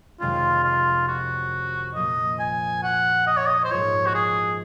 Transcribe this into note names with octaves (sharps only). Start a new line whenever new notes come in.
F2 C3 D#3 G#3 C#4 F4
F4
F#4
A#2 F3 A#3 F4 D#5
G#5
F#5
D#5
C#5
D#5
C5
G#2 F3 A#3 F4 C#5
F#4
G#4